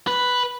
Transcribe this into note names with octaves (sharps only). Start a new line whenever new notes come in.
B4